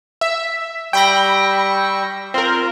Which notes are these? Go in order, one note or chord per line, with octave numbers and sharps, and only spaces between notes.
E5
G3 G5 B5 C#6 E6 A#6
C4 F4 A#4